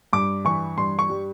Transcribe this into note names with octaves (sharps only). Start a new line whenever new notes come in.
G2 D6
E3 C#6
G2 C6
C#6
G3